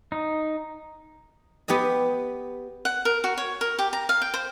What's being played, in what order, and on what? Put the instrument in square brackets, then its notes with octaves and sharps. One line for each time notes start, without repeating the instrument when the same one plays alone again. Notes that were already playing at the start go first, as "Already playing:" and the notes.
[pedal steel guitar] D#4
[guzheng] B3 G4 B4 D#5
[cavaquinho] F#5
A#4
F#4
C#5
A#4
G4
A#5
F5
G5
C5